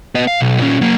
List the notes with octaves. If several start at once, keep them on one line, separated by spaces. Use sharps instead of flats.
B3 D#5
F5
B1
A#2 C#4
F#3 A#3